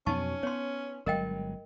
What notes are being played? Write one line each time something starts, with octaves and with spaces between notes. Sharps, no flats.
F2 B2 F#3 C#4 D#4 A5 C#6
B3 C#5 C6
G1 F#3 G#3 A#4 D#5 G5